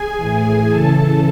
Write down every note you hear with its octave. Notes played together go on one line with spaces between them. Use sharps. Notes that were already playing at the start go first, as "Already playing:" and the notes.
Already playing: G#4 G#5
A2 E3
C#3 E3 A4 A5